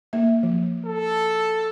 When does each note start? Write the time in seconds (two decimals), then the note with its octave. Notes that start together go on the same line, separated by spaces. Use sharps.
0.13 A#3 E5
0.43 F3
0.85 A4